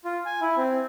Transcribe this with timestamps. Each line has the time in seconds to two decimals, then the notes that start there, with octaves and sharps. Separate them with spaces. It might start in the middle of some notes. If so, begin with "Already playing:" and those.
0.05 F4
0.26 G#5
0.41 E4
0.57 C4